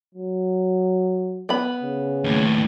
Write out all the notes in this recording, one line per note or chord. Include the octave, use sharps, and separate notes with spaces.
F#3
B3 B5
C#3
D#2 A2